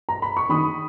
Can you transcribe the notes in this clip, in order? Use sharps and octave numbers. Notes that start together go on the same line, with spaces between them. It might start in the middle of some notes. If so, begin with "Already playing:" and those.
A#5
B5
C#6
D#3 B5 D#6